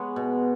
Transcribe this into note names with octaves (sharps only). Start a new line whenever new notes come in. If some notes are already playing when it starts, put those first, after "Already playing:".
Already playing: G#3 B3 B4 C#5
B2